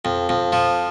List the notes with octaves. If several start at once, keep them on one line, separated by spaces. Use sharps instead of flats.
F2
F2
F3